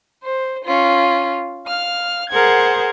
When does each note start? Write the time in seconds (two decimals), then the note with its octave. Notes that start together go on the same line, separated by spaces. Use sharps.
0.23 C5
0.64 C#4 F4
1.66 F5 F6
2.30 G#4 A#4 C5 F#5 G#6